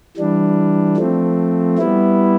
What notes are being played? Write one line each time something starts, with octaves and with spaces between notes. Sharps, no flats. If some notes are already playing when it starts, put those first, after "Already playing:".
E3 G3 D4
F3 A3 C4
G3 B3 E4